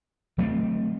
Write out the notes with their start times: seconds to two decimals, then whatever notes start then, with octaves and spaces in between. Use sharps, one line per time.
0.38 F#3 A3 B3 C4